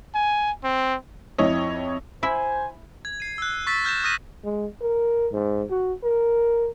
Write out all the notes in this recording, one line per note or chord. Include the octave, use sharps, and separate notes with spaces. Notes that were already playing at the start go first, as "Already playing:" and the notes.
G#5
C4
F2 E4 C#5 D#5
E4 C5 E5 G#5
G#6
C7 D#7
E6 F#6
C#6 E6 A6 B6
F6 G6 A#6 E7
D#6 F6 A6 A#6 D#7 E7
G#3
A#4
G#2
F#4
A#4